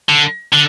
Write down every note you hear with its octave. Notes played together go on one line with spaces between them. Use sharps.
D3
D3